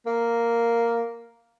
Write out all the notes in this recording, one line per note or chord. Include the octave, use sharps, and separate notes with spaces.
A#3